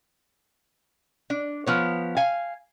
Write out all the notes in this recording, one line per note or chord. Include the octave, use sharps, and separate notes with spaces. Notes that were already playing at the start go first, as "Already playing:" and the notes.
D4
F3 B3 C#5
F5 G#5